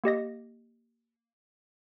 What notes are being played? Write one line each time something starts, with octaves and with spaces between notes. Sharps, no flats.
A#3 G4 D#5 A#6